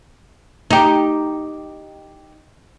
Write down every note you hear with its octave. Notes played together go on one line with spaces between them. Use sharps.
D#4 G4